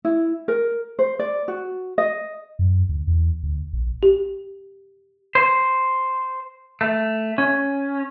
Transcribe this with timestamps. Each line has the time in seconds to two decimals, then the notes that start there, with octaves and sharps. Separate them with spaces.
0.05 E4
0.48 A#4
0.99 C5
1.19 D5
1.48 F#4
1.98 D#5
2.59 F#2
2.89 D2
3.07 E2
3.43 D2
3.73 A#1
4.03 G4
5.35 C5
6.81 A3
7.38 C#4